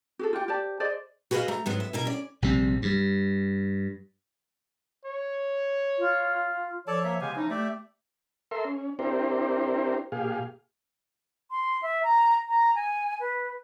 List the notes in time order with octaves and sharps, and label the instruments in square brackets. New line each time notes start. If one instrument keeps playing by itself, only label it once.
[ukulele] F#4 G#4 A4
F4 G4 F#5 G5
G4 C5 D5 A5
G#4 C5 D5 D#5
[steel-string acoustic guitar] F#4 G#4 B4 C5 D#5 F5
A3 A#5
G#2 F#3 B3
E5
B2 E4 A#4
C#4 D5
[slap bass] A#1 C3 G3 C4
G2 G3
[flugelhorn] C#5
[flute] F4
[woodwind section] F3 C#5 [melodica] A4 D5 A5
[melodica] A#3 E5
[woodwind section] C#3 F5 G#5 [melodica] G#3 B3 G4
[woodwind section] F3 D#4 [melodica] C#4 E4
[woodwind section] A3 [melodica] G4 D5 E5
[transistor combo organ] A4 A#4 E5 C6
C#4
C4 D4 E4 G4 A#4 C5
A#2 G4 G#4 F5
[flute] C6
E5
A#5
A#5
G#5
B4